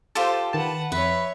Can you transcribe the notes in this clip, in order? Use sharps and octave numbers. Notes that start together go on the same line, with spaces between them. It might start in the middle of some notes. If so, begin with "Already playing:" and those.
F4 G4 A4 C5 A5
D#3 B4 F#5 A5
F2 B4 C#5 E5